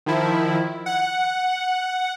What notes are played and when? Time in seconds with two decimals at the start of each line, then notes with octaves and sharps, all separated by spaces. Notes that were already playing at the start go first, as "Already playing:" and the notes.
0.06 D#3 F3 E4
0.86 F#5